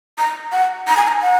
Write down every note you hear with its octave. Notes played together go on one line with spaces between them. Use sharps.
A#5
F#5
A#5
G#5
A#5
F#5